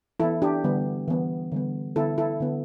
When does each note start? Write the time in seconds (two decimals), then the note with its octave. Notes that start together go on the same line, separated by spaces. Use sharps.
0.20 E3 B3 E4 A4
0.42 D4 G4
0.64 D3 G3 B3
1.08 E3 B3
1.52 D3 G3 B3
1.96 D3 B3 E4 A4
2.18 E4 A4
2.40 D3 B3